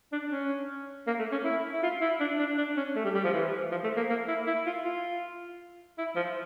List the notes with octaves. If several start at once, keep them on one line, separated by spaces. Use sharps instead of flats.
D4
C#4
A#3
A3
C#4
E4
E4
F4
E4
D4
D4
D4
C#4
A3
G3
G3
F3
E3
F3
A3
A#3
A#3
E4
E4
F4
F4
E4
F3